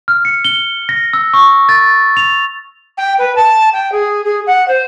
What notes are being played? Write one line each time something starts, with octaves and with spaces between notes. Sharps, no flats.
F6
C#7
G7
A#6
E6
C#6
A6
F7
G5
B4
A5
G5
G#4
G#4
F#5
C5